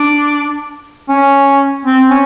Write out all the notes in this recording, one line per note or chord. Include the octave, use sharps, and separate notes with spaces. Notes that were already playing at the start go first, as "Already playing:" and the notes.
Already playing: D4
C#4
C4
C#4